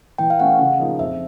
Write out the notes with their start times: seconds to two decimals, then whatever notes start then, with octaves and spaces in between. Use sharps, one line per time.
0.18 E3 G5
0.30 F5
0.39 A3 C#4 F#5
0.59 C#3 F5
0.79 F3 A#3 D#4 G#4
0.99 F2 E5